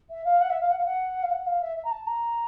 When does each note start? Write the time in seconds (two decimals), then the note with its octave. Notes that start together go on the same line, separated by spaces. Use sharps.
0.10 E5
0.24 F5
0.40 F#5
0.50 E5
0.60 F5
0.70 F#5
0.77 F5
0.85 F#5
1.22 F5
1.30 F#5
1.46 F5
1.61 E5
1.76 E5
1.84 A#5
1.91 A5
2.06 A#5